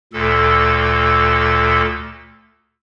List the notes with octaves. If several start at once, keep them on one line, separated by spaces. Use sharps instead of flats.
D2 A#2 A4